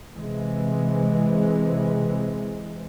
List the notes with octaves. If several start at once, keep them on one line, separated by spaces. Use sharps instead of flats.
C3 E3 G#3